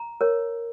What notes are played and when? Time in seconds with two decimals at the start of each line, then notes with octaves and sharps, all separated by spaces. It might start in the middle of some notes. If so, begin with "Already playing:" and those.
Already playing: A#5
0.21 A#4 C#5